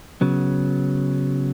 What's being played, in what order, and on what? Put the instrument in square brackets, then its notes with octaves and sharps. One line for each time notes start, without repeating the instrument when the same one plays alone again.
[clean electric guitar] C#3 F#3 B3